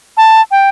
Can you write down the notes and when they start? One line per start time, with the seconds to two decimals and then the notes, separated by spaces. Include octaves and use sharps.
0.17 A5
0.51 G5